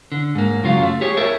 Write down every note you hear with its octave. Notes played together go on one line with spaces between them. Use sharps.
D3
G#2 A#3
F#2 C#3 F#3 F4 F5
A3
G4 G#4 C#5
A4 A#4 C#5 E5